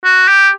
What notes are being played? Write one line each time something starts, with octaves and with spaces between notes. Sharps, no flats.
F#4
G4